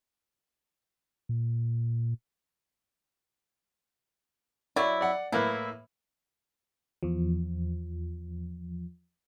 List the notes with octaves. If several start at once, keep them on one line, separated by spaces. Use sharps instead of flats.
A#2
F#3 E4 D5
D5 F#5
A2 A#3 E4 B4
E2 F3